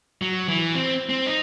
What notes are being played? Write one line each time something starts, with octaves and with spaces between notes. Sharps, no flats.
F#3
E3
C4
C4
D#4